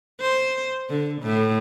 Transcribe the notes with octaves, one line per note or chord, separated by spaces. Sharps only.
C5
D3
A2